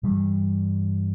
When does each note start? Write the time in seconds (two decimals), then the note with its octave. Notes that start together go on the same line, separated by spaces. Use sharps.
0.03 G2 E3 G3